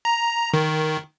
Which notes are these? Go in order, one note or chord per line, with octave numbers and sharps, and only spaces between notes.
A#5
D#3